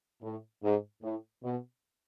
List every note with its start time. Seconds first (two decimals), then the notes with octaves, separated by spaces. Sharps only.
0.22 A2
0.63 G#2
1.02 A2
1.43 B2